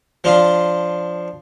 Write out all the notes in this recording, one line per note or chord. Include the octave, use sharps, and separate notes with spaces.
F3 D4 F4